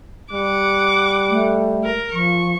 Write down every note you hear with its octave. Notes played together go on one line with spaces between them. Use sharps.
G3 F#5 D6
A3
A#4
F3 C#6